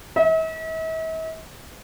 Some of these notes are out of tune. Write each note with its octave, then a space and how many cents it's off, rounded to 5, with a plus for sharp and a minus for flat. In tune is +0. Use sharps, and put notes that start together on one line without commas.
E5 -45